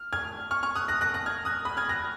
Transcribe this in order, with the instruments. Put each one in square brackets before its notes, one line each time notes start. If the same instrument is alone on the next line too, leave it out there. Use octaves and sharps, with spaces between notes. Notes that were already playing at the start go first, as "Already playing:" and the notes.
Already playing: [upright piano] F6
F6 G#6
C#6 F6
C#6 F6
D#6 F#6
F#6 A#6
F#6 A#6
F#6 A#6
F6 G#6
D#6 F#6
B5 D#6
F6 G#6
F#6 A#6